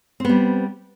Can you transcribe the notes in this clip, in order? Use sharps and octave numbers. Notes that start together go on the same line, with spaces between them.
G3 B3 C4